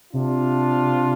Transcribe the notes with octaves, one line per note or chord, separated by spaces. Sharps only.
C3 D4 F4